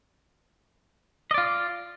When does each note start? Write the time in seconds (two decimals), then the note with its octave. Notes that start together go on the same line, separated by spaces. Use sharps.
1.31 D#5
1.34 D5
1.38 F4